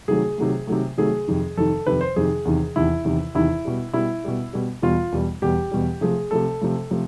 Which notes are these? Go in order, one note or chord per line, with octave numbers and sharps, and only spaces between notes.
C3 D#3 F#3 A3 G#4
C3 D#3 F#3 A3
C3 D#3 F#3 A3
C3 D#3 F#3 A3 G#4
F2 C3 D#3
F2 C3 D#3 A4
F2 C3 D#3 B4
C5
F2 C3 D#3 G#4
E2 C3 D#3
E2 C3 D#3 E4
E2 C3 D#3
E2 C3 D#3 E4
B2 G3
B2 G3 E4
B2 G3
B2 G3
E2 B2 G3 F4
E2 B2 G3
E2 B2 G3 G4
E2 B2 G3
C3 F3 A3 G#4
C3 F3 A3 A4
C3 F3 A3
C3 F3 A3